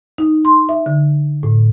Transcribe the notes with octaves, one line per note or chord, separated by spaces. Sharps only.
D#4
C6
E5
D3
A2